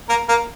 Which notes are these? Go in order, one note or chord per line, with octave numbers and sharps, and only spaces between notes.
A#3 A#4
A#3 A#4